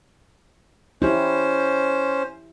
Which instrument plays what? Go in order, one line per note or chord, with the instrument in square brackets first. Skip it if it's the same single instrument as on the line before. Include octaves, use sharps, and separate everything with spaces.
[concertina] C#4 C5 [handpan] E4 G4